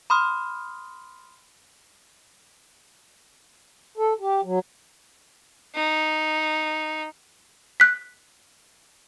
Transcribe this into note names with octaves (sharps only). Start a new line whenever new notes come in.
B5 C6 D#6 F6
A4
G4
F#3
D#4
F#6 B6